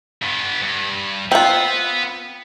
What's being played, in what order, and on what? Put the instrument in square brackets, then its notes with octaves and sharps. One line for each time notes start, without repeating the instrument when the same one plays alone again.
[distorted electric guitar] G2 B3
G2
[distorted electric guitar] B3 F#5 [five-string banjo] C4 F4